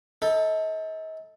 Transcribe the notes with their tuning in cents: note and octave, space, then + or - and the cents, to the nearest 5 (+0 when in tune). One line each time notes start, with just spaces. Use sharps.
D#4 +40 A4 +0